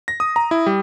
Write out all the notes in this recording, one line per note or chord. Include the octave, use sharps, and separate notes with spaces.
A#6
D#6
A#5
E4
G3